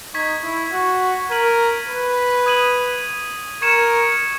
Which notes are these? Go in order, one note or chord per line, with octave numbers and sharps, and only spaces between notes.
D#4 C#6 G#6 B6
E4
F#4
A#4 G#6 B6 D#7 F#7
B4
D#6 G#6 D#7 F#7
A#4 C#6 G#6 C#7 E7